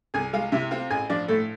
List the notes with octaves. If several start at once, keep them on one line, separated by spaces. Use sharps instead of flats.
C2 G#4 G#5
G#3 F4 F5
C3 E4 E5
C4 F4 F5
A1 G#4 G#5
F3 D4 D5
A2 A3 A4